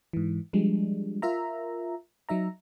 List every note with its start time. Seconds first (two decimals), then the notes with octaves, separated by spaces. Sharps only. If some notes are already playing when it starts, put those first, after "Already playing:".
0.13 G#2 E3
0.53 F3 G3 G#3 D4
1.22 F4 A#4 E5 A#5
2.29 F#3 D#4 E5 A#5